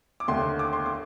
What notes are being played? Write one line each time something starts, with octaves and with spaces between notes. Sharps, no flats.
D6
D#2 D3 A3 C6
D6
C6
D6